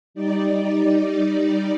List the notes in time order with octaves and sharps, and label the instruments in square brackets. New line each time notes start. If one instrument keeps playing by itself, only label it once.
[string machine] G3 D#4 D5